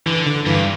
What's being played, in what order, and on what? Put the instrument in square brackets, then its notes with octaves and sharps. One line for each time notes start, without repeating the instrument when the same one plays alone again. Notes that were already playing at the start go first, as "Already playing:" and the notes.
[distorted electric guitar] D3 [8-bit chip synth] E3
[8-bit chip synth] D3
[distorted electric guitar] G2 [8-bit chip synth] E3